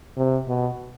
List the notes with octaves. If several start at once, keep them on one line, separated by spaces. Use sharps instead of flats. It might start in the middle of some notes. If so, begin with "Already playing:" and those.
C3
B2